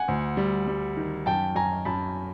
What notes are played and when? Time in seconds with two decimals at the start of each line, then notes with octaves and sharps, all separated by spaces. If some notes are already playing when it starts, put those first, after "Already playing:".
Already playing: F#5 G#5
0.08 D2
0.37 G3
0.67 G3
0.97 D#3
1.26 F#2 G5 A5
1.55 F#2 G#5 A#5
1.85 F#2 A5 B5